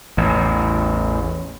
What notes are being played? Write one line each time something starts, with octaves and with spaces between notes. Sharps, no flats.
A1 E2